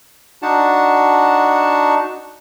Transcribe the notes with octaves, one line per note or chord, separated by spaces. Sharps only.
D4 D#4 F#4 F#5 A5